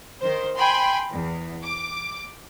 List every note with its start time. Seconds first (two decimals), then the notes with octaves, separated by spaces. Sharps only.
0.20 D#3 C5
0.56 G5 G#5 B5 C6
1.11 E2
1.63 D6